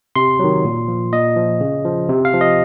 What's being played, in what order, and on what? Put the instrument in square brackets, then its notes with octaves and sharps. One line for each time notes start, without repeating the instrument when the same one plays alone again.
[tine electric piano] C3 C6
D#3 F#3
A#2
F3
A#2 D#5
F3
C#3
F3
C3
F5
F3
D#5